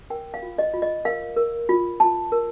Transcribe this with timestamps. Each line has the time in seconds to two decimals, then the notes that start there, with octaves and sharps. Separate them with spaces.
0.10 A#4 G5
0.34 F5
0.42 F4
0.58 D#5
0.73 F4
0.82 D#5
1.05 A#4 F5
1.36 A#4
1.69 F4
2.00 F4 A5
2.32 A#4